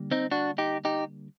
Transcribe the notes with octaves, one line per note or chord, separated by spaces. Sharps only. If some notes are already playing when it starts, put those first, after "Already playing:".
Already playing: D3 G3 A#3
C4 D#4
D4 F#4
D#4 G4
D#4 G4